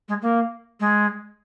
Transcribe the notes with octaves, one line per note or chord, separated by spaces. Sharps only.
G#3
A#3
G#3